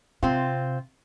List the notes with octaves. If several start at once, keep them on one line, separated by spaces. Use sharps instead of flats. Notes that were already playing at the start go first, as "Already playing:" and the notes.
C3 C4 F4